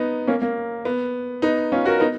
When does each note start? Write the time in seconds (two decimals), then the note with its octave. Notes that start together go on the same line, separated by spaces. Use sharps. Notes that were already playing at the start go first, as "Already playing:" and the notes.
Already playing: B3 D#4
0.27 A#3 C#4
0.42 A#3
0.85 B3
1.42 B3 D#4
1.72 C#4 F4
1.85 F#4 A#4
2.00 B3 D#4